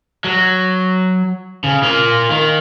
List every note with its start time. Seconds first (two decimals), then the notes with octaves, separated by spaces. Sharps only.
0.24 F#3
1.64 C#3
1.83 A#3 F4
2.30 D#3